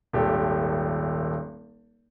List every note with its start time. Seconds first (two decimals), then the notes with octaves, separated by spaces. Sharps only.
0.13 D#1 G#1 G4 A4